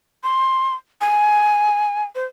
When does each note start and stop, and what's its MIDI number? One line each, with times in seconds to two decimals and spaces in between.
0.23 0.75 84
1.01 2.04 80
2.15 2.25 72